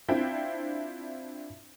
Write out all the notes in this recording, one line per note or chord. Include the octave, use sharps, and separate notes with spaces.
C4 D4 E4 F4 G5